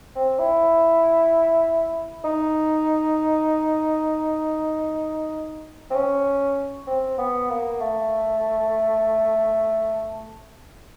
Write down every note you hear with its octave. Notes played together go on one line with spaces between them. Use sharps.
C4
E4
D#4
C4
C#4
C4
B3
A#3
A3